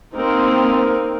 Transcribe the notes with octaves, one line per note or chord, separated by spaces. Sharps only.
A#3 C4 D#4 A#4